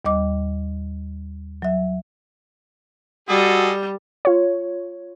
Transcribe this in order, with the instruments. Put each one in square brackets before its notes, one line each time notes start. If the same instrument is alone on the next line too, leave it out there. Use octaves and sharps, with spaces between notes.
[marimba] D#2 G3 D#5 D6
F#3 E5
[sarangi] G3 [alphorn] F#4 [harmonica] G#4 A4 D#5
[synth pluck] F4 C#5